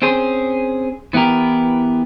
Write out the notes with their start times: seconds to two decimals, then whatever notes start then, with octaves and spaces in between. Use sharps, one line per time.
0.02 C4 C#4 G#4 C5
1.13 E3 B3 E4 G4 A#4